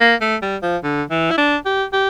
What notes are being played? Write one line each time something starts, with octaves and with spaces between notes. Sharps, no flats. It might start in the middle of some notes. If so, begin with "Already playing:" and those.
A#3
A3
G3
F3
D3
E3
E4
D4
G4
G4